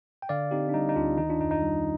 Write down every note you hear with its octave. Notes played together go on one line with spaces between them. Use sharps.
G5
D3 D5 F5
C4 D#4 G4
D4
G3 D#4
D#4
D2 D4 F4
D#3 D#4
D4 F4
F2 D#4
D#4
G3